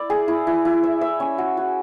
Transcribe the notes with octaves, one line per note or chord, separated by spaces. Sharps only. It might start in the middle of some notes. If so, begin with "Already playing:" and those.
Already playing: E4 D5
G#4
E4
E4
E4
E5
E5
C#4
F#4
F#4